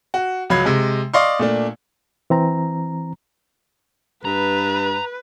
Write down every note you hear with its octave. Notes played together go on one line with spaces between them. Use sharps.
F#4
C#2 F#3 B5 G#6 C7
C3 G#3
D5 D#5 F5 C6 C#6
A#2 A3 D4
E3 C4 A#5
G2 B4 A#5